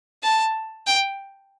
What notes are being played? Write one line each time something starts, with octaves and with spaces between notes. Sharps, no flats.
A5
G5